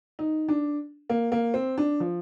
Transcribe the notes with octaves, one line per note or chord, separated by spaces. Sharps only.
D#4
D4
A#3
A#3
C4
D4
F3